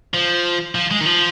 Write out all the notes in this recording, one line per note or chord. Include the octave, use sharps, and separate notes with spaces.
F3
F3
G#3
D#3
F3